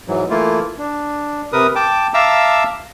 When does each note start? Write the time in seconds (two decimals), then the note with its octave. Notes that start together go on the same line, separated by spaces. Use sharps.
0.08 G#2 E3 F#3
0.30 E3 A3 A#3 E4 F4
0.78 D4
1.52 C3 A#4 B4 D#6
1.76 G5 A5 D6
2.14 E5 F5 A5 A#5 D6 E6